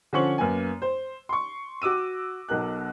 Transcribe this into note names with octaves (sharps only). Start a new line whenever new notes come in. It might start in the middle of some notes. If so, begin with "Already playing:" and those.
D3 F3 C#4 C5 C#6 F#7
F#2 A#3 B3 G#5
C5
C6 C#6
F#4 D6 E6 D#7
B1 B2 A#4 F#6